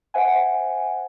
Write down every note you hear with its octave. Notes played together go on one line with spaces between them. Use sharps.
C5 E5 F#5 G#5